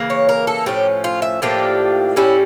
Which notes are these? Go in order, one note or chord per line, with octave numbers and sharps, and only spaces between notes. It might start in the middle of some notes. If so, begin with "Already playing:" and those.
Already playing: C#3 E3 A#3
C#5
A#4
A4
A2 F3 C#4 G4
F4
E5
A2 F3 A#3 D4 G4
A2 G3 C#4 E4